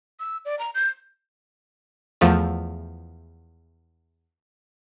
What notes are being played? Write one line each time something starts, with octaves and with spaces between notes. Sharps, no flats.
E6
D5
A#5
G6
E2 F3 A3